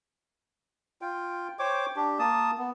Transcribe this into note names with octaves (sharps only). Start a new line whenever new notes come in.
F4 G5
C5 C#5 G5 D6
D4 G4
A#3 A5 D#6
B3